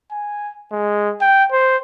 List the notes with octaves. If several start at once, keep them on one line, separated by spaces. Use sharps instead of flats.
G#5
G#3
G5
C5